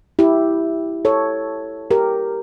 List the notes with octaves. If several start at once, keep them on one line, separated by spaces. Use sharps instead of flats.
E4 G4
A4 C#5
G4 A#4